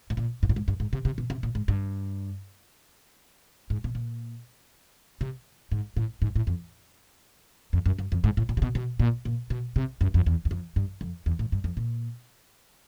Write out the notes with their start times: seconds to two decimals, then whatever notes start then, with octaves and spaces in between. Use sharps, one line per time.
0.10 A2
0.17 A#2
0.43 G#2
0.49 A2
0.56 G#2
0.68 G2
0.80 G#2
0.93 C3
1.05 C3
1.18 B2
1.30 C3
1.43 A#2
1.55 G#2
1.68 G2
3.70 G#2
3.84 B2
3.95 A#2
5.21 C3
5.71 G#2
5.96 A2
6.22 G#2
6.35 A2
6.47 F2
7.73 F2
7.86 F#2
7.98 F#2
8.12 F2
8.24 G#2
8.37 A2
8.49 A#2
8.57 C3
8.62 B2
8.75 B2
8.99 A#2
9.25 A#2
9.50 B2
9.76 C3
10.01 F#2
10.14 F2
10.26 E2
10.45 E2
10.51 F2
10.76 G2
11.01 F2
11.26 E2
11.39 A2
11.52 G2
11.64 F2
11.77 A#2